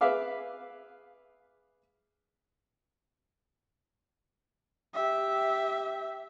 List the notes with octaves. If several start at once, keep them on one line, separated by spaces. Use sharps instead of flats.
G#4 B4 E5 F5 D6
G4 E5